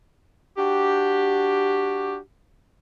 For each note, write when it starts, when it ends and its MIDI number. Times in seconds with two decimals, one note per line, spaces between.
0.57 2.17 62
0.57 2.17 66
0.57 2.17 67